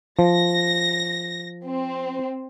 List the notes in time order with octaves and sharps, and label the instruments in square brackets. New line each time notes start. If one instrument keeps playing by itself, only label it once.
[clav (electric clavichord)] F3 [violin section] A#6
[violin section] C4